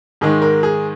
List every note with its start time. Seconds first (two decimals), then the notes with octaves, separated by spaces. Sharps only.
0.21 G#2 D#3 G#3 G#4
0.42 A#4
0.63 G#4